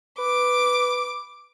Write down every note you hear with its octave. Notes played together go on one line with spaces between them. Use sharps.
B4 D6